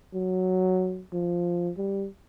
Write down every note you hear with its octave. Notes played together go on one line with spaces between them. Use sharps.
F#3
F3
G3